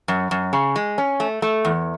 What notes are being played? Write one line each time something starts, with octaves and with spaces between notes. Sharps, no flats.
F#2
F#2
C#3
G#3
C#4
A3
A3
E2